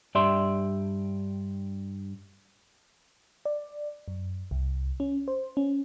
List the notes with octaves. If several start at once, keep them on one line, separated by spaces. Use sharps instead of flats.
G2 G4 D5 E5 C6
D5
F#2
C2
C#4
C5
C#4